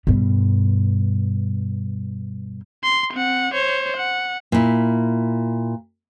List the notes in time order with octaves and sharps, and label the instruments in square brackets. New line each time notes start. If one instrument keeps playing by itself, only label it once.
[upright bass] G2 B2
[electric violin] C6
C4 F#5
C5 C#5
F#5
[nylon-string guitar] A#2 E4